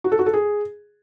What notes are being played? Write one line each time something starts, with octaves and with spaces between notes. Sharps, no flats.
F#4
A4
F#4
A4
G#4